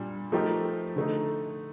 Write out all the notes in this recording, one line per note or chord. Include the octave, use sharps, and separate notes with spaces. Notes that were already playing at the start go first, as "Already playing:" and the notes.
Already playing: A#2 G3 D4
F3 A3 D#4 G4 A#4
D3 A3 D#4